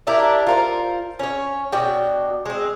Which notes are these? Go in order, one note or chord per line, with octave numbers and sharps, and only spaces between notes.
D4 E4 G4 A#4
F4 A#4 C5
C#4 C#5
B2 D4 F#4 G5
G#3 C4